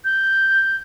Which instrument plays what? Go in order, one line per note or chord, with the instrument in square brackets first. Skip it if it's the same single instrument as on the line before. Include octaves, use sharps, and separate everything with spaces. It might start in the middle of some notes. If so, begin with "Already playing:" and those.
[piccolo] G6